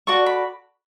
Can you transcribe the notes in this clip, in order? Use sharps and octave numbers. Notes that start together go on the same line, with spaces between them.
F#4 A4 D5 C#6
B5